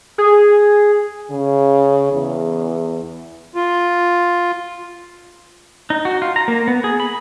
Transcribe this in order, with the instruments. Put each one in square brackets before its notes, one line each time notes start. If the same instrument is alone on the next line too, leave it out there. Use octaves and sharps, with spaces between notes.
[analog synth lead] G#4
[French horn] C#3
E2
[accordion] F4
[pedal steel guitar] D#4
F#4
F4
A#5
A#3
B3
G#4
B5